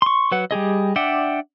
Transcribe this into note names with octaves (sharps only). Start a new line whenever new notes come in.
C6 C#6
F#3 B4 F#5
G3 G4 G#4 D#5
D4 D5 E5 F#5 G5